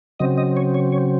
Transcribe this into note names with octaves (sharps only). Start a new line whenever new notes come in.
C#3 F#3 C4 D#5
D#5
C#5
C#5
C#5